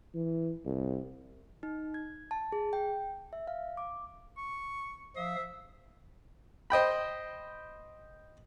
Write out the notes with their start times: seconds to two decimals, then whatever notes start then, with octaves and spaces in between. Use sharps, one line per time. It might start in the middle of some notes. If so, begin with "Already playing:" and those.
0.14 E3
0.65 C2
1.63 D#4
1.94 G#6
2.31 A5
2.52 G#4
2.73 G5
3.33 E5
3.47 F5
3.77 D6
4.37 C#6
5.16 F3 E5 F5 D#6
6.70 C5 D#5 G5 B5